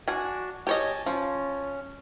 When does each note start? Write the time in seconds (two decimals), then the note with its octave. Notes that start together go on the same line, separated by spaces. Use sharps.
0.08 D4 F#4 G#5
0.67 G4 C#5 D#5 G#5 A5
1.06 F3 C#4